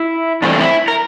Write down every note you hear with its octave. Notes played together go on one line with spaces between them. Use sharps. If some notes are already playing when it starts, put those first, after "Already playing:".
Already playing: E4
G2 E3 A3 C4 D4
E4
A#4